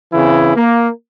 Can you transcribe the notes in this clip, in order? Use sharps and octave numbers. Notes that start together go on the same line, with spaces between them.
C#3 E3 C4 E4
A#3